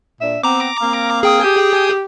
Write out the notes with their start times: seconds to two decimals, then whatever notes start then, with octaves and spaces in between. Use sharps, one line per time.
0.20 A#2 D4 E5
0.43 B3 C4 A#5 D6
0.81 A#3 C4 F5
1.23 G#4 G5 D#6
1.44 G4